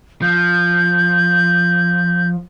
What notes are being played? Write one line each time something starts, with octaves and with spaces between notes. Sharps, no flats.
F3 G6